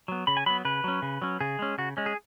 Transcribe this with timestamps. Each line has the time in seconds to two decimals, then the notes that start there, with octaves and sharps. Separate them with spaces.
0.08 F#3 B3
0.27 C#3 B5
0.37 G#5
0.46 F#3 B3 B5
0.65 C#3 B4
0.84 F#3 C#4
1.02 C#3
1.22 F#3 C#4
1.41 C#3 G#4
1.59 G#3 C#4
1.78 C#3 F#4
1.97 G#3 C#4
2.06 G#4